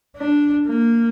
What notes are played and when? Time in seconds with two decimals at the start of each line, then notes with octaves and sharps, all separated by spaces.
0.16 D4
0.66 A#3